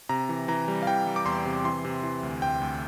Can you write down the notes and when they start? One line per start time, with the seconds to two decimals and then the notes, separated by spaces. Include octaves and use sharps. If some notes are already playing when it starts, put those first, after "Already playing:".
0.09 C3 A#5
0.29 E3
0.48 E3 A#5
0.68 G3
0.82 F5
0.87 E3 G5
1.07 G3
1.16 D6
1.25 E2 C6
1.45 C3
1.65 E3 C6
1.85 C3
2.03 E3
2.23 D2
2.42 D2 G5
2.62 D2